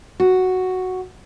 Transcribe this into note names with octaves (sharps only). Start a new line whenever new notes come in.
F#4